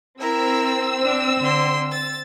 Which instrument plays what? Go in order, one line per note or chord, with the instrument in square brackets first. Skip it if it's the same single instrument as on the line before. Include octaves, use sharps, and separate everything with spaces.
[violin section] C4 E6 [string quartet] E4 A#4 A#5
[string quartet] D4
D3 C6
A6